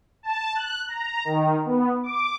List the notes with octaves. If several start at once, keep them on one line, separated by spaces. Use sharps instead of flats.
A5
F#6
A#5
D#3
B3
D6